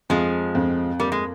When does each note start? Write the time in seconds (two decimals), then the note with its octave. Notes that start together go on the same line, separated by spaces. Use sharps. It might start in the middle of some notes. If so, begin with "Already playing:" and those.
0.10 F2 F3 G#3
0.55 F2
1.00 G3 A#3
1.12 G#3